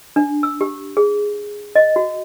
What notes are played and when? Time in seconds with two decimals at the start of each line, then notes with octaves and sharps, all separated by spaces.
0.16 D4
0.43 E6
0.61 G4
0.97 G#4
1.75 D#5
1.96 F#4